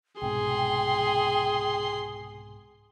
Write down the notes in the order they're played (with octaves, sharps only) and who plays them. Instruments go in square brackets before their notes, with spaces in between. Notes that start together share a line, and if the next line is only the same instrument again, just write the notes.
[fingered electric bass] C2 G#2 B2 [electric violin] G#4 C6 [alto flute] G5